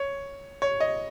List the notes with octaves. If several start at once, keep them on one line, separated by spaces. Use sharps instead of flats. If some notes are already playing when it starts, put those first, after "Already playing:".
Already playing: C#5
C#5
D#5